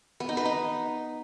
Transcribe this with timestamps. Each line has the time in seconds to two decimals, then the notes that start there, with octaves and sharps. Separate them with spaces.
0.20 B3
0.29 D#4
0.37 B4
0.45 D#4